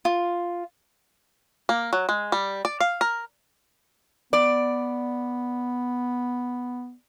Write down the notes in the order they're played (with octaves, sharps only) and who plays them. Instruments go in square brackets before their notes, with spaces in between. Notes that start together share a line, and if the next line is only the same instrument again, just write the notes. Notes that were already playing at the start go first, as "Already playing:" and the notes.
[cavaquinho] F4
[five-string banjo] A#3
F#3
G#3
G3
D5
F5
A#4
[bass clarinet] B3 [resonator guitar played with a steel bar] D5